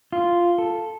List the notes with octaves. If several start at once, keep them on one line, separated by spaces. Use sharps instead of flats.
F4
A4